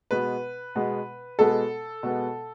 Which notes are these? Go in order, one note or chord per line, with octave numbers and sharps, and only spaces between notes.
B2 G#3 B3 B4
B2 G#3 B3
B2 G#3 B3 A4
B2 G#3 B3